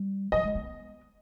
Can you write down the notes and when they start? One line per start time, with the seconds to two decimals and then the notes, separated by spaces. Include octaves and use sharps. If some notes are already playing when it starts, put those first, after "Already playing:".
Already playing: G3
0.32 F#3 D#5
0.44 G#3
0.55 B3